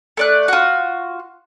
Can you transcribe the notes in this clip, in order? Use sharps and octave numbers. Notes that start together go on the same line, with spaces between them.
A3 D5 F#6
F4 F#4